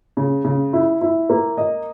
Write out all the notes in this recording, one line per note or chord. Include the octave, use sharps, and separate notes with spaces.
C#3
C#3
E4
E4
A#3
D#5